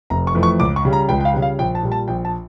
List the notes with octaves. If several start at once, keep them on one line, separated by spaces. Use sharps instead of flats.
F1 A#5
C#6
F2 E3 A3
C#6
C#2 D6
C#6
C#3 G3
A#5
C#2 G5
G5
F5
C#3 G3
F5
A#1 G5
A5
A#2 G3
A5
A#1 G5
A5